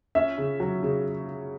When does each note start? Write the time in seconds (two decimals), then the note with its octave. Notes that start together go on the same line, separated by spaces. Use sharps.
0.15 C#4 E5
0.38 C#3
0.60 F#3
0.83 C#3